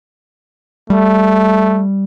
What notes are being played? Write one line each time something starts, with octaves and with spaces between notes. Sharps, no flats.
G3 A3